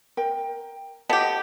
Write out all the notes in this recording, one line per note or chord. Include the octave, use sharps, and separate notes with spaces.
A#4 G5
B3 G4 A4 D#5 A5